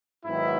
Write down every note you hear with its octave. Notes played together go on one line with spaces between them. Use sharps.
G#2 D#3 F#3 B3 E4